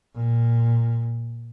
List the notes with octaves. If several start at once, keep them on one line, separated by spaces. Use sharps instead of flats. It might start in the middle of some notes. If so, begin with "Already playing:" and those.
A#2